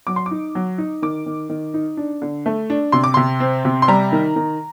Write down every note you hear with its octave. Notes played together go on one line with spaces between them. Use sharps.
F#3 D6
C6
D6
D#4
F#3
D#4
D#3 D6
D#3
D#3
D#4
D4
D3
A3
D4
C3 C6
D6
C3 C6
C4
C3
C6
G3 A#5
D#3
D#3